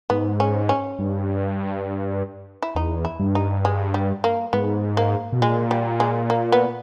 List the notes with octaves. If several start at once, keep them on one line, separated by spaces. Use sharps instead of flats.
G#2 B3
C#4
C#4
G2
E4
E2 D#4
E4
G2
D#4
G#3
G3
A#3
G#2 B3
A#3
B2
A#2 G#3
G3
G#3
A#3
B3